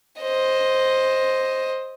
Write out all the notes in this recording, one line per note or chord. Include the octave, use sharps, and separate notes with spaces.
C5 D#5